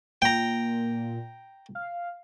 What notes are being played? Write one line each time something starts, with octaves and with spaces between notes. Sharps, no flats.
A#2 G5 A#5
F5